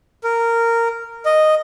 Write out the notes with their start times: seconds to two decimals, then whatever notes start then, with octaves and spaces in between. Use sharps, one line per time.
0.24 A#4
1.26 D#5